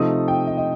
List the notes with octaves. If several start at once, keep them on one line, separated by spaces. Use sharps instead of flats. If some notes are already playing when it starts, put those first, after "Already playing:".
Already playing: C3 F3 A3 D#4 D#6
G5
D#5
D#5